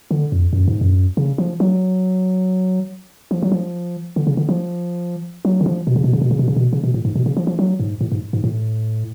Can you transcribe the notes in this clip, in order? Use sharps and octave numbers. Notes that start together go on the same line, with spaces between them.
D3
F2
F#2
G#2
F#2
C#3
F3
F#3
F3
F#3
F3
D3
C#3
D3
F3
F#3
D3
F3
B2
C#3
B2
C#3
B2
C#3
B2
C#3
B2
C#3
B2
A2
G#2
B2
C#3
F3
F3
F#3
G#2
A2
G#2
G#2
A2